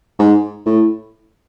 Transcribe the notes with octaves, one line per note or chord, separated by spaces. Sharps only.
G#2
A2